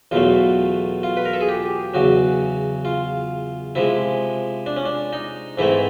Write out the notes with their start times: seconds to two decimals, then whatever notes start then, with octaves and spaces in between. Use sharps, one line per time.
0.11 E2 B2 F#3 A3 F4
1.03 F4
1.17 B4
1.25 A#4
1.33 A4
1.41 G#4
1.49 G4
1.94 E2 C#3 F#3 F#4
2.85 F4
3.75 C3 F3 G#3 E4
4.66 D4
4.77 C#4
4.85 D4
5.13 D#4
5.58 G#2 E3 A3 C4 E4